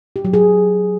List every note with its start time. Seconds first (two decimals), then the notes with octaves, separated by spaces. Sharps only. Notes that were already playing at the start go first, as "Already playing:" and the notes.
0.16 G4
0.25 F#3
0.33 G#4